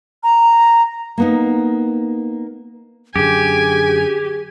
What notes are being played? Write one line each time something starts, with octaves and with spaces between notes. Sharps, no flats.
A#5
A#3 B3 D#4
F#2 D3 G4 G#4 G#5